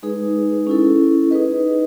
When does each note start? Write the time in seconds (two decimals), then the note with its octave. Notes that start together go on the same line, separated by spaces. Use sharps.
0.03 G#3 D#4 G#4 B4
0.67 C#4 E4 A4
1.31 D#4 G#4 B4 D#5